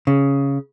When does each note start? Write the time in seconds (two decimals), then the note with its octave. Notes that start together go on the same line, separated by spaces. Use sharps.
0.07 C#3